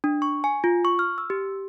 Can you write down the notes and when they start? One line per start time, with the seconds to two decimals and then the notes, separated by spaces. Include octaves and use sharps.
0.04 D4
0.22 C#6
0.44 G#5
0.64 F4
0.85 C#6
0.99 F6
1.18 E6
1.30 G4